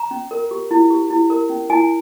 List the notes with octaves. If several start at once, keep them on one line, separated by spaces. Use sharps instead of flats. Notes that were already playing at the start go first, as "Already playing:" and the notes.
Already playing: A#5
C#4
A#4
G4
E4
G4
E4
A#4
C#4
E4 G#5